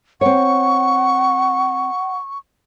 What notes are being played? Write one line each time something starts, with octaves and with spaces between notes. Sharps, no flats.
C4 C#5 F#5 C#6